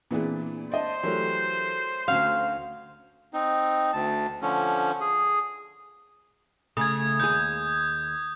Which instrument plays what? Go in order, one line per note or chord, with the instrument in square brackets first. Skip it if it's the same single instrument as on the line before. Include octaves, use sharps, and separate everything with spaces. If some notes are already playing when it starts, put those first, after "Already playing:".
[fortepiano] A#2 B3 D4 [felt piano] E3 C4 G#4
[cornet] C5 [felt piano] D5 D#5 A5
[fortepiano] E3 F#3 G4 [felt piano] A3 A#4 C#5
[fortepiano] D2 C#4 F#4 [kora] F5
[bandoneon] C4 D#4
D2 A5
D3 F3 C#4
G#4
[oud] C#3 A3 [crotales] D#6 G#6
[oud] D#2 G#4 [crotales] G6